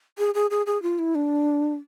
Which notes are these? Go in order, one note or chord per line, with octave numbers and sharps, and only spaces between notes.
G#4
G#4
G#4
G#4
F4
E4
D4